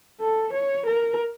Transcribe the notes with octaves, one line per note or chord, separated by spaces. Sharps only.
A4
C#5
A#4